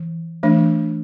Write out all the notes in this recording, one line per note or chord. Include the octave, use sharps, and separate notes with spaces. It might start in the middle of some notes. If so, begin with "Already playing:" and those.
Already playing: E3
E3 A3 D4